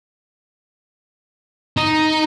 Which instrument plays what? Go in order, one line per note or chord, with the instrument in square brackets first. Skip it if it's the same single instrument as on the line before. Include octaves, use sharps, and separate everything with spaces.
[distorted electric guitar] D#4